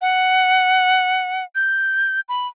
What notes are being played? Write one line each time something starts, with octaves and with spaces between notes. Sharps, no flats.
F#5
G6
B5